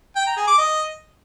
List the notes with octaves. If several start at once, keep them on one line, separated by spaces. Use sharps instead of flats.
G5
A#5
G#4
D6
D#5